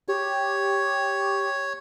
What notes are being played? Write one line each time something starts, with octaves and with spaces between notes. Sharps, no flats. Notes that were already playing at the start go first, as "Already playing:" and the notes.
G4 C#5